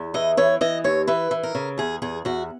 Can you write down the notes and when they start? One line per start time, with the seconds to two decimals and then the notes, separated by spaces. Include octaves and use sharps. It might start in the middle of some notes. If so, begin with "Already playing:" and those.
Already playing: E2
0.14 E3 D#5
0.37 E3 C#5
0.61 E3 D#5
0.84 D#2 C#5
1.07 E3 B4
1.31 E3
1.43 A#4
1.55 C#3
1.78 E2 G#4
2.02 E2 G#4
2.25 E2 F#4